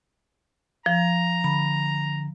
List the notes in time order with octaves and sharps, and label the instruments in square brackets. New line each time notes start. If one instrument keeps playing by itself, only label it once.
[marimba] F3 [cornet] A#5
[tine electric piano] D3 [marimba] B5